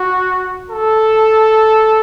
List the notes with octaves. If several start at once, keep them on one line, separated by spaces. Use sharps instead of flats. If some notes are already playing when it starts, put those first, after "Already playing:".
Already playing: F#4
A4